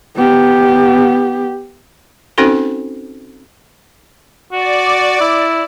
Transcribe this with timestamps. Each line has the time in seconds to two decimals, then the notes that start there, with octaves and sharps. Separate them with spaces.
0.16 B3 G4
2.38 C4 C#4 D#4 F#4 A4 C5
4.52 F#4 D5
5.20 E4